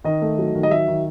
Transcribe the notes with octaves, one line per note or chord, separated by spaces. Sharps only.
D#3 D#5
A3
F#3
D#3
D#5
F#3 E5
D#3